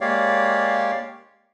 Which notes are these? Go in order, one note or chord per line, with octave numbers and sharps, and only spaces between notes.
G#3 A#3 G4 C#5 D5 F5